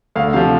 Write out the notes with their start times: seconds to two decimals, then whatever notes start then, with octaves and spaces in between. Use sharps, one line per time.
0.16 D2 F5
0.33 C3 F3 F5